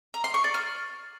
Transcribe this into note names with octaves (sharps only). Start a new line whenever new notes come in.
A#5
C6
C#6
D5
F6